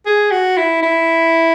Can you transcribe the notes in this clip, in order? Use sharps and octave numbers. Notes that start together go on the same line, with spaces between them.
G#4
F#4
E4
E4